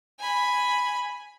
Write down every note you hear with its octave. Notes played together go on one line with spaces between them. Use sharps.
G#5 B5